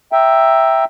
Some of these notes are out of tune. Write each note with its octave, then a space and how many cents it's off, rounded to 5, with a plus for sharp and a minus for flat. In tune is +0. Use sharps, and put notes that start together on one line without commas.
E5 +0 G5 +0 A#5 +0